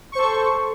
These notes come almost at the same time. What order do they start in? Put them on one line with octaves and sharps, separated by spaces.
C#6 C5 A4